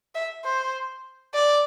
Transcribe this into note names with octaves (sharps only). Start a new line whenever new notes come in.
E5
C5
D5